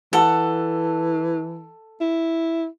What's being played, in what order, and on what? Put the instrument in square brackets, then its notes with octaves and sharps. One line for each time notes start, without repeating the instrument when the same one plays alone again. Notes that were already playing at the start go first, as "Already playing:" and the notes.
[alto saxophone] E3 [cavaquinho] A4 F#5
[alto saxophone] E4